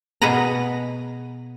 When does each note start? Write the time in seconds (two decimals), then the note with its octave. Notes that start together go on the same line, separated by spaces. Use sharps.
0.22 B2 B3 G#4 B4 F#5 A#5